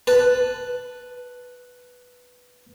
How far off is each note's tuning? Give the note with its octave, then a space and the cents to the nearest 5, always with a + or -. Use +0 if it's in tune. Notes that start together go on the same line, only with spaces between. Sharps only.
B4 +0 A5 +0